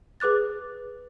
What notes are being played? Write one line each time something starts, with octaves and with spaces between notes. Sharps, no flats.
G#4 B4 D6 F#6 A6